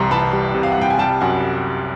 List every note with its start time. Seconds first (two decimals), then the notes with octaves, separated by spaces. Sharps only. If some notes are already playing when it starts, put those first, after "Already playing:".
Already playing: C2 C3 E3 G3 A#5 C6 C#6
0.11 E3 A5 B5
0.33 G3
0.55 C3
0.63 F5
0.72 F#5
0.78 C2 G5
0.90 G#5
0.98 G3 G5 A5
1.20 F#2 F#5 G#5